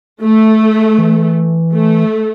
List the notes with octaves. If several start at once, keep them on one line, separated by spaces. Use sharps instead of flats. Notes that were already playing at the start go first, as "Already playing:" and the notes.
A3
E3
A3